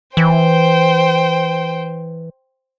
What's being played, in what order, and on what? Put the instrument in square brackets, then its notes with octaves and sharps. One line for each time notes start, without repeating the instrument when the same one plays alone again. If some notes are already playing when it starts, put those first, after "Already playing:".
[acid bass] E3 [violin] C5 G5